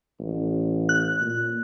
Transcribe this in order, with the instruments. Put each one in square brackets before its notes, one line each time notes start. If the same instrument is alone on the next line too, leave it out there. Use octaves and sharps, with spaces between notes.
[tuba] A1
[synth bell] F#6
[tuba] A#2